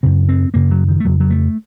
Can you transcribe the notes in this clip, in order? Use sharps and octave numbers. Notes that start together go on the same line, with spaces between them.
F#2 C#3 C4
C4
F#2 C#3 A#3
F#3
D#3
A3
F2 C#3 F#3
F#3
A3